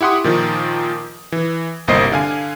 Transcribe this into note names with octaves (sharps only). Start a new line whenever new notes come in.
E4 G4 F#5 C6 D#6
A#2 D#3 F3
E3
G1 C2 A#3 C5 D#5 C7
D3 F5 G#5